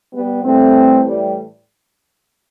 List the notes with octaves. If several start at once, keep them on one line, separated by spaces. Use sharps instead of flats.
G3 B3
A2 E3 G3 A3 C4
G3